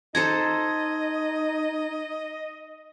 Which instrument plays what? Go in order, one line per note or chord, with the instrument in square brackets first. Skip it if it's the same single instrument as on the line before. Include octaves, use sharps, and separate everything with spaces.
[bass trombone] D#4 [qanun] A4 C5 A#5 [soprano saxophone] D#5 [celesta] G#6